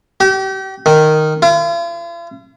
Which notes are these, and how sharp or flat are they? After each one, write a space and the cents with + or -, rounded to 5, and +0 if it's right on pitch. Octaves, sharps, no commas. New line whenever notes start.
G4 -35
D#3 -10
F4 -45